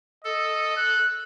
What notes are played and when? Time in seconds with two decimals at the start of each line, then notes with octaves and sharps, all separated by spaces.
0.25 A4 D#5
0.77 F#6